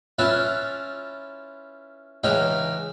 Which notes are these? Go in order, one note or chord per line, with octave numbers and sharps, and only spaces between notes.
C#4 E4 F4 B4 E5 A5
C#2 E3 C#4 D#4 D#5 G5